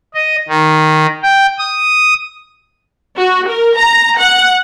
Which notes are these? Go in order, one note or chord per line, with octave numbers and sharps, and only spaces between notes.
D#5
D#3
G5
D#6
F#4
A#4
A#5
F#5